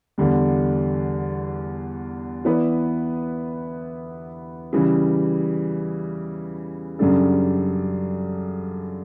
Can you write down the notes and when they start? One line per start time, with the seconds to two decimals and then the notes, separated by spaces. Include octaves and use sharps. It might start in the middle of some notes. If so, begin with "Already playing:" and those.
0.18 E2 D3 G3
2.45 E3 B3 E4 B4 D5
4.73 C#3 E3 G3
6.99 F#2 C#3 G3 D4 A4